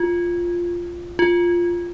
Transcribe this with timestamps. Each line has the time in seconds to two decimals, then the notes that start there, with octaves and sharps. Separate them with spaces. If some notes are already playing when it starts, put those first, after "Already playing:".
Already playing: F4
1.19 F4